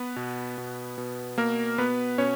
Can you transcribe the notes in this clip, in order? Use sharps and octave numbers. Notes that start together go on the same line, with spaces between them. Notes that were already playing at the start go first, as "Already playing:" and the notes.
Already playing: B3 B4
B2
B2
B2
B2 A#3 A#4
B2 B3 B4
B2 C#4 C#5